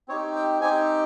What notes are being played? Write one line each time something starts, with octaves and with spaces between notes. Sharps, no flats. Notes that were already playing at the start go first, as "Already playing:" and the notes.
C4 D#4 G4 C#5
G5
C4 D#4 G4 G#5